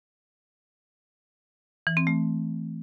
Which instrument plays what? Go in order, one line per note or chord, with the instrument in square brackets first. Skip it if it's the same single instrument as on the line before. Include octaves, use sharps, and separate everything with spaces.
[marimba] E3
C4
A3